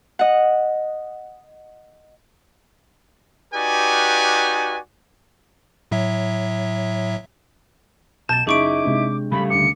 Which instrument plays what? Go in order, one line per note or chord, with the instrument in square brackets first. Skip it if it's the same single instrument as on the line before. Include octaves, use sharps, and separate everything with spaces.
[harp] D#5 F#5
[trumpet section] D#4 F#4 G4 B4 D5 G#5
[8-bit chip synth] A2 F#3 E5
[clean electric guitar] B1 [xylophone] A5 A6 [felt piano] G6 [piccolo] E7
[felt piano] F#1 [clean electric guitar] D#4 E4 [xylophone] G#4 C#6 D7 [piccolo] D6
[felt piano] C3 G#3 D4
[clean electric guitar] C#3 G3 A3 [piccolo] B5
[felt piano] D2 D6 [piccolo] C#7